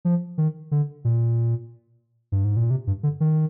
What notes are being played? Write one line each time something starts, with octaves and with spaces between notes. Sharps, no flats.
F3
D#3
D3
A#2
G2
G#2
A#2
C3
G2
D3
D#3